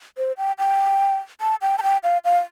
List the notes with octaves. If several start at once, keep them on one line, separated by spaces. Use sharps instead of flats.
C5
G5
G5
A5
G5
A5
G5
F5
F5